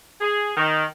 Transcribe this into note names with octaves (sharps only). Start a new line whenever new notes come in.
G#4
D#3